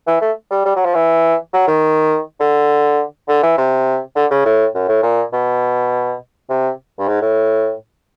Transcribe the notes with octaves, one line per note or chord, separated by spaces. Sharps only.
E3
A3
G3
G3
F#3
F3
E3
F#3
D#3
D3
D3
E3
C3
D3
C#3
A2
F#2
A2
A#2
B2
C3
G2
G#2
A2